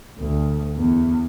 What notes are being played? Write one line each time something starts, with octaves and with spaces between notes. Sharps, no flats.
D2
E2